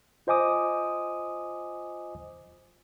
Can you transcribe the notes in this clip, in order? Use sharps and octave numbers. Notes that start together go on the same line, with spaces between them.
F4 C5 D#5 G#5 D6 D#6